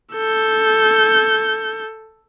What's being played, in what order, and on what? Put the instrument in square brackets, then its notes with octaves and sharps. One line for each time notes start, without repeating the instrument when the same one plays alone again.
[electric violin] A4 G6